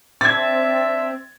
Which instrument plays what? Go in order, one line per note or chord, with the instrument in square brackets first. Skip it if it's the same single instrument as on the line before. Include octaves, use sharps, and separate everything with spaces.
[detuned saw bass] C4 [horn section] D4 E5 [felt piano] G#6 A6